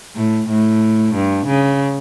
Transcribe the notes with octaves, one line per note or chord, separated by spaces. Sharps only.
A2
A2
G2
C#3